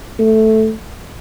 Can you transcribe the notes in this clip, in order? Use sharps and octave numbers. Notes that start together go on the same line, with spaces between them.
A3